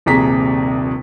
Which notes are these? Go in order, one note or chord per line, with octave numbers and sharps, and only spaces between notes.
D#1 A#1 C3 G#4 A#5 B6